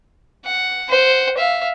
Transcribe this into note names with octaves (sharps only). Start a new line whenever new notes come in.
F#5
C5 F#5
E5 F5